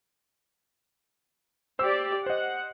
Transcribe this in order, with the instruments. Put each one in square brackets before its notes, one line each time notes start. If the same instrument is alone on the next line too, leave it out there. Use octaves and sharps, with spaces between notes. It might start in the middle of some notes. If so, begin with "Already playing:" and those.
[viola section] G4 D5 [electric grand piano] C5 E6
[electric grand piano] C5 D#5 [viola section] F#5